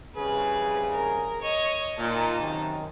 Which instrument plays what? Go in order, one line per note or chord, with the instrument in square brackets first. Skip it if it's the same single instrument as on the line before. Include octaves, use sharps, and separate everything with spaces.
[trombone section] C2 C#3 G#4 [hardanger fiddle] B4
[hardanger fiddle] A#4
C#5 D#5
[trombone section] A#2 [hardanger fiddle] D#4 A5
[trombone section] F#2 C3 D#3